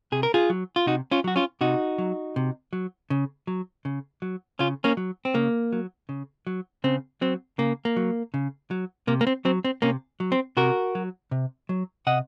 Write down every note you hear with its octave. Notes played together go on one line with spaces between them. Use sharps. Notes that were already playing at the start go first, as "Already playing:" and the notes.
C3 G#4
A#4
F4 G#4
F#3
F4
C3 D#4 F#4
C#4 F4
F#3 F#4
C#4 F4
C3 D#4 F#4
F#3
C3
F#3
C#3
F#3
C#3
F#3
C#3 C#4 F4
A#3 C#4
F#3
C4
C#3 A#3
F#3
C#3
F#3
C#3 C4
F#3 C4
C#3 A#3
A#3
F#3
C#3
F#3
C3 A#3
A#3
C4
F#3 C4
C4
C3 A#3 C#4
F#3
C4
C3 F#4 A#4
F#3
C3
F#3
C3 D#5 F#5